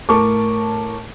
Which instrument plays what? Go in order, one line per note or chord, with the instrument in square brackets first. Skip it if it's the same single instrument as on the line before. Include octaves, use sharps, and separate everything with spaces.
[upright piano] A2 A#4 A5 C#6 D6